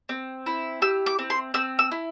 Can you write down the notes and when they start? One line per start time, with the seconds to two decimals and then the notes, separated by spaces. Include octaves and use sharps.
0.09 C4
0.46 E4
0.82 G4 E6
1.06 D6
1.19 C4
1.30 C6
1.54 C4 E6
1.79 E6
1.92 E4